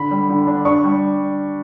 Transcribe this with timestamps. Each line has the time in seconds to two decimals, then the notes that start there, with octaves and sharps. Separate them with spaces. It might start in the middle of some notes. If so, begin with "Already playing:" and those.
Already playing: D3 B5
0.11 G3
0.29 D3
0.47 D4
0.65 D4 C#6
0.84 G3